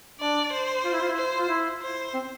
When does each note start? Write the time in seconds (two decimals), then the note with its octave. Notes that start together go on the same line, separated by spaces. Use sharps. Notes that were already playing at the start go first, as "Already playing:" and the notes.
0.20 D4 D5
0.52 C5
0.84 F4
0.93 E4
1.01 F4
1.09 E4
1.17 C5
1.38 F4
1.49 E4
1.82 C5
2.14 C4